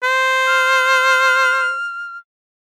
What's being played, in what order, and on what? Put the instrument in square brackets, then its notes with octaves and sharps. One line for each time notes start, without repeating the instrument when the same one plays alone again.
[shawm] C5
[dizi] F6